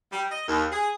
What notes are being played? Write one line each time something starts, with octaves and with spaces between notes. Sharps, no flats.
G3
D#5
D#2
G#4